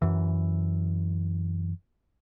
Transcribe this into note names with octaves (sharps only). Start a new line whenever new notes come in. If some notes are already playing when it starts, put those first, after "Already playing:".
F#2 E3